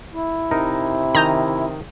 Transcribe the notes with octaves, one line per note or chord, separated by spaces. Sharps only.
E4
C3 D#4 A#4
D#3 D#5 G#5 A#5 G6